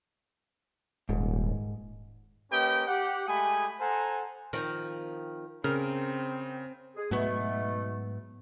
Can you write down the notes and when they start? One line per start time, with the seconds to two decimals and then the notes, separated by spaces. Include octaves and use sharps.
1.09 D#1 G#2
2.51 A#3 C#4 G4 B4 D#5 G5
2.87 G4 F#5
3.27 G#3 A3 G4 G#5 B5 D#6
3.80 A4 C5 F#5 G#5 A#5
4.53 D#3 F3 C4
5.64 C#3 C4 A#4
6.95 G#4
7.11 G#2 B2 F#3 A3 B3